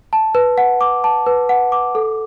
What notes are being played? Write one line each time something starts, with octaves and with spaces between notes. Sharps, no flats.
A5
B4
F#5
D6
A5
B4
F#5
D6
A4